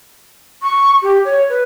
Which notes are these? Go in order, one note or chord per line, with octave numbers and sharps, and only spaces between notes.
C#6
G4
C#5
B4